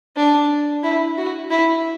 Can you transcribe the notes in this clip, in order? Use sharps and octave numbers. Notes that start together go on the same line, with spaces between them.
D4
E4
F#4
E4